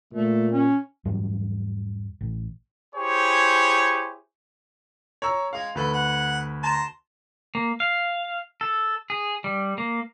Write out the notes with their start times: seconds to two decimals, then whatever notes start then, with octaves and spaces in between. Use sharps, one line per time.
0.13 A#2 A3
0.52 C#4
1.05 E2 G#2 F#3 G3
2.21 A1
2.95 E4 G4 G#4 C5 C#5
5.22 C#5 A#5 E6
5.53 G#3 F5
5.75 D2 A4 B4
5.93 F#5
6.63 A5 A#5 C6
7.55 A#3
7.80 F5
8.61 A4
9.10 G#4
9.44 G3
9.78 A#3